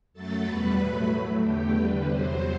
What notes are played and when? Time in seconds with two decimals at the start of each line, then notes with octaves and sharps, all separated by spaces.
0.14 F#2 F#3 A3 A4 A5
0.45 E2 B2 G3 B4 B5
0.78 A2 F#3 A3
1.09 A2 F#3 A3
1.41 E2 D3 A3 G4 G5
1.73 E2 D3 G3 B4
2.05 E2 C3 F#3 C5